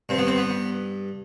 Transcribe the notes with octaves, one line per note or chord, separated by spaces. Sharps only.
G2 C4
B3
C4
B3